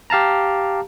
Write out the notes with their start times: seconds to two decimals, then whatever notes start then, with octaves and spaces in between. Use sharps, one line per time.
0.10 G4 F5 A5 A#5